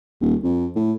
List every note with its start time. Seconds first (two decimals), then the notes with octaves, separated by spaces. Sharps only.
0.21 D#1
0.44 F2
0.75 A2